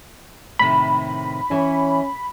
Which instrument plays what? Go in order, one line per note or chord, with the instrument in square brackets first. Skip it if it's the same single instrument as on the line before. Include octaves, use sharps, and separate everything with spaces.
[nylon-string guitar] A2 C3 D#3 [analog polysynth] B5
[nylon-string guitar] E3 C#5 [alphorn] C#4